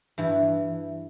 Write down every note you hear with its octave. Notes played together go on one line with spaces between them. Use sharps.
G2 E3